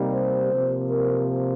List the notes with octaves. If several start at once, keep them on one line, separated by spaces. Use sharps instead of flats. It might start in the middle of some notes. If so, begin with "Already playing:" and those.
Already playing: C3 G3 A#3 D#4
C5
C3 F3 A#3
A#4